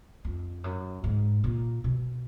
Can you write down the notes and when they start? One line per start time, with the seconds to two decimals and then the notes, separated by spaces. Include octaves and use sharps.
0.25 F2
0.64 F#2
1.04 G#2
1.44 A#2
1.84 B2